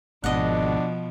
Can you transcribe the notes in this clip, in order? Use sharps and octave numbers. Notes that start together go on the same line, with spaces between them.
G#1 B2 F3 D4 D#5 F#5